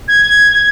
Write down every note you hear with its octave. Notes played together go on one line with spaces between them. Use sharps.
G#6